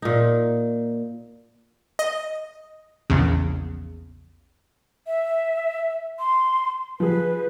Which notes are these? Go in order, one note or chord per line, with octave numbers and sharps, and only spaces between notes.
A#2 D#4
D#5
A#1 E2 C#3
E5
C6
F3 G#4 B4